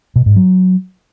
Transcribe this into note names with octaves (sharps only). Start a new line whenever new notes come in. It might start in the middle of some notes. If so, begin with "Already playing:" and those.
B2
G#2
F#3